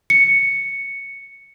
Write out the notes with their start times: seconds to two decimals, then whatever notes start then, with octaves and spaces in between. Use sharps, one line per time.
0.10 C#7